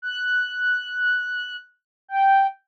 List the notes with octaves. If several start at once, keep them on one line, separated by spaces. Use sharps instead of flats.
F#6
G5